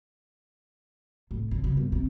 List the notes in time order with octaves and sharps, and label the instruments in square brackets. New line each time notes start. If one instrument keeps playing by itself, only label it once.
[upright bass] A2
D3
C#3
G1
C3